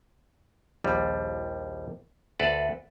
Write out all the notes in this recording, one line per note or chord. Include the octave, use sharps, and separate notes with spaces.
A#1 D#2 F3 G3
D2 A4 B4 D5